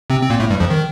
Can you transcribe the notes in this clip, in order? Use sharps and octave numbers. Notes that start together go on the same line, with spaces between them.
C3 C4
C4
A#2 A#3
A2 A3
G2 G3
F2 F3
D#3